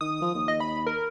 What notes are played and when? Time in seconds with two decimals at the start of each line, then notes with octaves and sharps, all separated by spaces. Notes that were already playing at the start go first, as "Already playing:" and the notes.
0.01 D#3 D#6
0.21 F3
0.35 D#2
0.48 D#5
0.60 B5
0.87 A#4